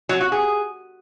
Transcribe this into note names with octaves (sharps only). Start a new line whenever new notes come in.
F#3
F#4
G#4